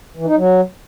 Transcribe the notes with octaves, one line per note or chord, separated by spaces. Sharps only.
E3
D#4
F#3